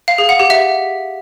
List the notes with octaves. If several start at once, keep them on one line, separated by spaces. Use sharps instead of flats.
F5
G#4
F#5
G4
E5